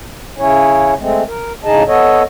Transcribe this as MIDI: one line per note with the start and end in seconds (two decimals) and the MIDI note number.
0.38 0.94 49
0.38 0.94 61
0.38 0.94 64
0.38 0.94 73
0.99 1.23 56
0.99 1.23 57
0.99 1.23 60
1.27 1.52 70
1.64 1.83 45
1.64 1.83 49
1.64 1.83 63
1.64 1.83 68
1.64 1.83 75
1.64 1.83 81
1.87 2.23 59
1.87 2.23 69
1.87 2.23 73
1.87 2.23 75